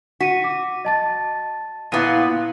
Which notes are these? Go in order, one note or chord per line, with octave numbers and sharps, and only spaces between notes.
F#4 B6 D#7
D6
D#5 A5 A6
A#2 B3 E4 F5 D#7